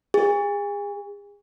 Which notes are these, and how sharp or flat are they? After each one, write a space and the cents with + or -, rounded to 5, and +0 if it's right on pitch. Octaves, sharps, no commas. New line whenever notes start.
G#4 -35